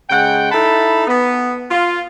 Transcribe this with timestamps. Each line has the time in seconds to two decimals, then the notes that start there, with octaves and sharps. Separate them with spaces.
0.10 C#3 G#3 F#5 G5
0.52 D#4 E4 A4 A5 B5
1.08 B3
1.71 F4